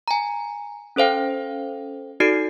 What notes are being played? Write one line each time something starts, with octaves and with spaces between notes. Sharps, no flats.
G#5 A#5
C#4 A4 C5 F5 G5
D#4 F#4 A4 D5 C7 D7